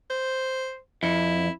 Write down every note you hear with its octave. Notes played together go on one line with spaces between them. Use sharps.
C5
F2 E4